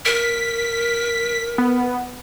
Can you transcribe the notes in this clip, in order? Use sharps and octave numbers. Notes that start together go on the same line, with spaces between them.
A#4 B6
B3